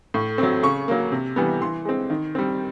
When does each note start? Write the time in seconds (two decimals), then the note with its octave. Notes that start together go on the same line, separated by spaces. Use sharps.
0.14 A2
0.38 F#3 A3 C4
0.63 C#3 C#6
0.88 F#3 A#3
1.12 C3
1.36 E3 G3 B3
1.61 E3 C6
1.85 G#3 C4
2.10 D#3
2.35 G3 C4